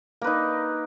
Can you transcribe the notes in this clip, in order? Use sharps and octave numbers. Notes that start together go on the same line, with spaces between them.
A#3 D#4 B4